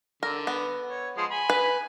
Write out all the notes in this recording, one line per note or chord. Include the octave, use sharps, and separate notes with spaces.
D3 A#4
B3
C#5
F3 G#3 C6
G#5 B5
B4